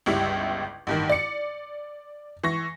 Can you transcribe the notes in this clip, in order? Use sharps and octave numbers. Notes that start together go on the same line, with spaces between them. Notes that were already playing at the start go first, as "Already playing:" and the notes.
G1 C#2 G3 E4
A1 G2 D#3
D5 C#7
E3 C#6 A#6